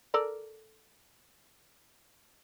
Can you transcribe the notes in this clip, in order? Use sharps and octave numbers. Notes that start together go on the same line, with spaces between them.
A4 A#4 D5